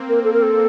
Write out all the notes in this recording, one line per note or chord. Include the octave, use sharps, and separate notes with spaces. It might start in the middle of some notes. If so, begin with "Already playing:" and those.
Already playing: A#3 C4
A#4
A4
A#4
A4